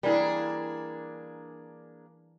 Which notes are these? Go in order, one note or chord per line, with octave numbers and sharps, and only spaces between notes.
E3 G3 A#3 D4 G#4